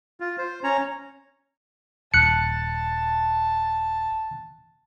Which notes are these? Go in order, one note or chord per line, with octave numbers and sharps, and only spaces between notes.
F4
C5
C#4 C#5 A#5
D#1 A5 F#6 C#7